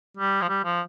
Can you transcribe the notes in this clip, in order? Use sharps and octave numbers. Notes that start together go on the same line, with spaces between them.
G3
F3
G3
F3